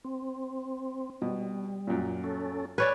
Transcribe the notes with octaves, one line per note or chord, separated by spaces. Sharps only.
C4
B2 G3
F#2 A#2
C#4 A4
B4 C#5 D5 G#5 F6 G#6